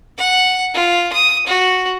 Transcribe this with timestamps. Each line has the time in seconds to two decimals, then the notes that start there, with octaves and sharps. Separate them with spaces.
0.18 F#5
0.74 F4
1.13 D#6
1.47 F#4